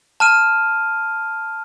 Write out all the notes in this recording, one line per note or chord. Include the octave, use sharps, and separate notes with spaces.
A5 F6 D#7